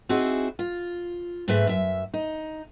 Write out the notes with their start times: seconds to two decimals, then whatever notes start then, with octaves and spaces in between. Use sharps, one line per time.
0.09 C4 D#4 E4 F#4 G#4
0.59 F4
1.48 G#2 A3 C4 B4 E5
1.67 F#2 E5
2.14 D#4